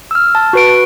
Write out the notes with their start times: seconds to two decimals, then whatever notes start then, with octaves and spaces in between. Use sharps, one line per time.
0.11 E6 F6
0.35 A5
0.53 F#4 B4 D7